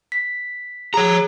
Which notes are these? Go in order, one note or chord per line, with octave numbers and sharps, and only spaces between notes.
B6
G#4 C#5 A#5